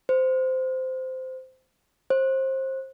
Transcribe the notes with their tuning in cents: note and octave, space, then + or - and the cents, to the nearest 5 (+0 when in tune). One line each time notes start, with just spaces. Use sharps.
C5 -15
C5 +25